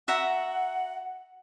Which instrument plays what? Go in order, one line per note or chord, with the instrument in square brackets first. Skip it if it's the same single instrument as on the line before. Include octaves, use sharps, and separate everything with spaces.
[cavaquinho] F#4 E5 A#5 [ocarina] F#5